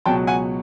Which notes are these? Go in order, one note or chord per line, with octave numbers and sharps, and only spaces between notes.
C#2 B2 F#3 G5 A5
F#5 G#5